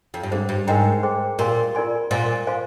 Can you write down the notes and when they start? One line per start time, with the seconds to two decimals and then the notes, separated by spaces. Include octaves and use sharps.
0.14 F2
0.23 G2
0.31 G#2 D4 G#4 C5
0.49 G2
0.67 G#2 A#4 D#5 G5 A#5
1.03 G#4 C5 G5 C6
1.39 A#2 G4 A#4 F5 G#5 C6
1.75 F4 A#4 D5 G#5 C6
2.11 A#2 C5 F5 G#5 C6
2.47 C5 F5 G#5 C6